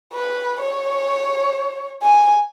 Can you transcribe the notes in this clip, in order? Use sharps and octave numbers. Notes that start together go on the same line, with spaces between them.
B4
C#5
G#5